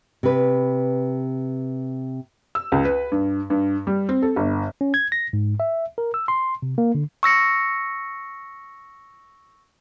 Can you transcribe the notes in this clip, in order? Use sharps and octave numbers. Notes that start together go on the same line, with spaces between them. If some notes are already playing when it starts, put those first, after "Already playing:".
C3 B4
E6
C#2
B4
G2
G2
G3
C4
A4
G1
C#4
G#6
A#6
G#2
E5
A#4
E6
C6
C3
A#3
D3
C#6 E6 A#6 C#7